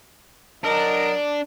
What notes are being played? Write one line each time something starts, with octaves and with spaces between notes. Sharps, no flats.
F#3 D4 A#4 D#5